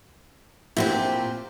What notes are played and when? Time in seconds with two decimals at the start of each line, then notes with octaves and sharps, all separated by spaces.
0.77 A#2 C4 E4 F#4 G4 C5